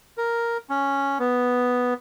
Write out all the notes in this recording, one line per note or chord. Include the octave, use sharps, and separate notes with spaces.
A#4
C#4
B3